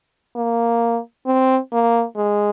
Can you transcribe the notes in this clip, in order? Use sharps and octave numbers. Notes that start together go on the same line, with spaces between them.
A#3
C4
A#3
G#3